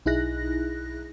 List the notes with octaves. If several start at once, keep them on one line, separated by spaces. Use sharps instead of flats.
B1 D#4 E4 G#4 F#6 A#6